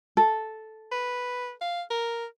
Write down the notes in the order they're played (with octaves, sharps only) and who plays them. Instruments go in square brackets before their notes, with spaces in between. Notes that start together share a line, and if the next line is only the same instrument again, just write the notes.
[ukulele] A4
[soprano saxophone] B4
F5
A#4